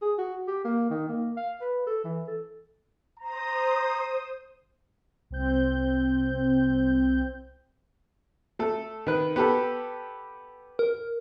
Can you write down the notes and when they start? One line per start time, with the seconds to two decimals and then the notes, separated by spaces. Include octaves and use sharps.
0.02 G#4
0.18 F#4
0.47 G4
0.65 A#3
0.90 D#3
1.09 A#3
1.37 F5
1.62 B4
1.87 A4
2.04 E3
2.28 A4
3.20 C5 A#5 D#6
5.30 C2 C4 G6
8.59 A3 A4
9.07 D#3 B4
9.36 B3 G4 A4
10.79 A#4